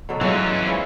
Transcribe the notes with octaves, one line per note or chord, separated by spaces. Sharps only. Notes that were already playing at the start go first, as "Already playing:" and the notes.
B2 D3 F#3
E3 F#3 G#3 C#4 F4
G#2 E4 F4